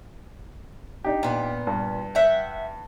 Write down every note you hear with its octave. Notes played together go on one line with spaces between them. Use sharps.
D4 D#4 G4
A#2 B3
G2
E5 F#5 G5